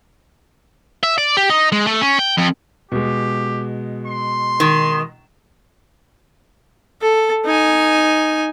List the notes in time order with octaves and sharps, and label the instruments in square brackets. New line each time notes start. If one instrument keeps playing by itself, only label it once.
[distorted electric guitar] E5
D5
G4
D#4
G#3
A3
C#4
G5
F2
[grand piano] B2 G#3 [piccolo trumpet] G4
[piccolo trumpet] C6
[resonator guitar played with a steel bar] D#3
[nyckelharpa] A4
D#4 G#5